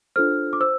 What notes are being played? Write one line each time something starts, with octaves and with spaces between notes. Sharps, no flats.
D4 F4 A4 C5 F6
D6
C5 E6